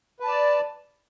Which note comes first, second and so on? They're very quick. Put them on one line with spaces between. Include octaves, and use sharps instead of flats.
B4 A5 D5